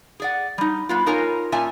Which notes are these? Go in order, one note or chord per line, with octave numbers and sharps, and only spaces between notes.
G#4 D5 F#5
G3 D#4
G3 B3 F4
D#4 F4 A#4 C#5 G#5
A#2 C#4 F4 E5 G#5 A5